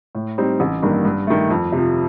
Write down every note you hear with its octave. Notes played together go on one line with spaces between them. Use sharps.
A2
G3 C4 D#4
A1
G2 D#3 A#3
G2
D#3 A3
F2
C3
F3